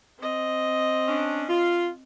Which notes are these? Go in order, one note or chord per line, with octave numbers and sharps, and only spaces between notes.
C4 D#5
C#4 D4
F4